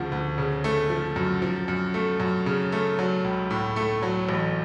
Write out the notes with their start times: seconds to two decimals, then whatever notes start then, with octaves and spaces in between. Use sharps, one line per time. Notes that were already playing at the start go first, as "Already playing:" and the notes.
Already playing: D2 C#3 F3
0.12 D2
0.38 C#3
0.64 A3
0.90 F3
1.16 F#2
1.42 F3
1.68 F#2
1.94 A3
2.20 F#2
2.46 C#3
2.72 A3
2.99 F#3
3.24 C#2
3.51 A2
3.76 A3
4.03 F#3
4.29 A1